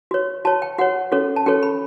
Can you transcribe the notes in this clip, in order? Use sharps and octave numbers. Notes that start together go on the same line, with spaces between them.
F#4 C#5
F#4 C#5 A5
G5
F#4 C#5 F#5
C#4 F#4 A4 C#5
A5
C#4 F#4 A4 C#5 G5
B5